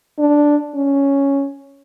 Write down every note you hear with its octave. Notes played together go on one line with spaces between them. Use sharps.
D4
C#4